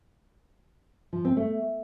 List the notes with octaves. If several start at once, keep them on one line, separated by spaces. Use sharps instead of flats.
F3
C4
A3